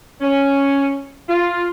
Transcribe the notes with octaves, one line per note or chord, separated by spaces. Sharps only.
C#4
F4